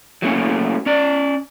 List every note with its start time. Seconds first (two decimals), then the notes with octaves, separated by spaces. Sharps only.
0.22 F#3 A3 A#3 C#4
0.86 C#4 D5